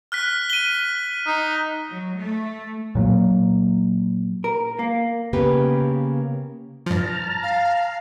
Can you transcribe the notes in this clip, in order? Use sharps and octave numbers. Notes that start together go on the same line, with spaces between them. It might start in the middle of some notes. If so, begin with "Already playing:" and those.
F6 F#6 B6
D#7 G7
D#4
F#3
A3
A#2 F#3 A#3
A#4
A#3
C#3 A#3 B3 G4 B4
G2 F3 A5 A#5 F6
F5